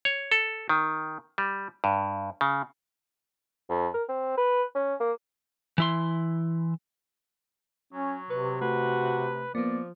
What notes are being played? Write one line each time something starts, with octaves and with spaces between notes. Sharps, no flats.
C#5
A4
D#3
G3
G2
C#3
F2
A#4
C4
B4
C#4
A#3
E3 E4 C6
F#3 C#4
C3 B4 C#6
A3 F#4 B4
F3 A#3 B3 D5